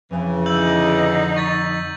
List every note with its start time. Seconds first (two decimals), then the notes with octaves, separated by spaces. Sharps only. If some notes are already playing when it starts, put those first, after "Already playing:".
0.11 F2 C#3 E3
0.46 D3 D#4 E6 G6 F#7
1.36 C#6 A6 B6